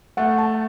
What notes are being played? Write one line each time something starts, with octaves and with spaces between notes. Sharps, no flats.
A3 F#5
A5